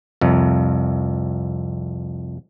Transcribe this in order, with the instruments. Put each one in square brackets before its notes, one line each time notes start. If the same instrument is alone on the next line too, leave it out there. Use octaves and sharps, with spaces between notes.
[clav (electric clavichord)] C2 F2